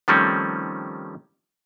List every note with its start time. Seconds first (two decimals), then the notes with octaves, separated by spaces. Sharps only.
0.08 D#3 F3 G3 A3 C4 C#4